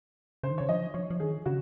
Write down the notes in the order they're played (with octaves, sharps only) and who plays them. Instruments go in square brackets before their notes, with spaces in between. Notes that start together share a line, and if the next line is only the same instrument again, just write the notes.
[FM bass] C#3 [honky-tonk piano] C5
[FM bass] D#3
[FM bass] C#3 [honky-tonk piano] C#5
[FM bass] F3 [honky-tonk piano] D#5
[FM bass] F3 [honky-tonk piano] C#5
[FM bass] F3
[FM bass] D#3 [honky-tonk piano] G#4
[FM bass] C#3 [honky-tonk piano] F#4